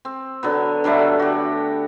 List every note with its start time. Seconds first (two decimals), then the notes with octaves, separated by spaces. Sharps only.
0.05 C4
0.43 D3 F#3 B3
0.84 D3 F#3 G3 A3
1.19 F#4 G4